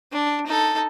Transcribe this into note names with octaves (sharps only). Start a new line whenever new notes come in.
D4
D#4 A4